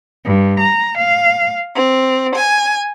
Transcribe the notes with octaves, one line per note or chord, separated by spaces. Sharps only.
G2
A#5
F5
C4
G#5